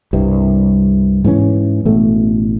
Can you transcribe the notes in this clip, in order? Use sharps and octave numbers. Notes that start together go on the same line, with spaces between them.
C2 G2 C3
G#2 E3 C#4
A1 B2 A3